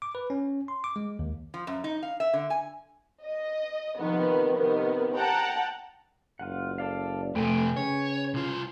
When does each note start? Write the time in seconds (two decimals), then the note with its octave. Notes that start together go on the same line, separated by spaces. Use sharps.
0.02 D6
0.15 B4
0.30 C#4
0.68 C6
0.84 D6
0.96 G#3
1.19 D#2
1.54 F3
1.67 F#2
1.84 D#4
2.03 F5
2.20 E5
2.34 D3
2.50 G#5
3.24 D#5
3.98 C3 D#3 F3 B3
4.57 C3 D#3 B3
5.16 F#5 G5 A5 A#5
6.39 F#1 F4 F#5
6.78 A4 D5 F5
7.35 F2 C3 A3 B4 G5 G#5
7.77 C#3 C#5
8.34 C2 F4